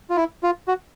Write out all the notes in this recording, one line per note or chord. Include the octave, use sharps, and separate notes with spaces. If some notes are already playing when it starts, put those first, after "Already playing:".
F4
E4
F4
F#4